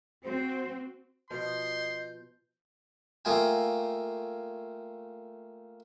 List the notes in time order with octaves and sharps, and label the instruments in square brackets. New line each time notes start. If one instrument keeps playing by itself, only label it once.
[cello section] C4 F#4 [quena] C5
[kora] B2 F3 [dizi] D#5 [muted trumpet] C6 [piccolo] G6
[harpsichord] A3 A#3 F4 D#5 G5 G#5